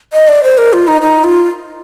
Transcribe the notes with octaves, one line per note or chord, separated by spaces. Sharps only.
D#5
D5
C5
A#4
F4
D#4
D#4
F4